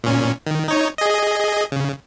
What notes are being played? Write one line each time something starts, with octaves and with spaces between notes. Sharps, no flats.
A#2 C#4
D#3
D#4 C#5
G#4 D#5
C#3